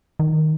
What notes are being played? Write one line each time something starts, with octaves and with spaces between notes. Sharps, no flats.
D#3